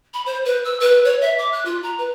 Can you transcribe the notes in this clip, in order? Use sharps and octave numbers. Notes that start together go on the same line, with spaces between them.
B5
C5
B4
E6
B4
C#5
E5
D6
F#6
F4
A#5
B4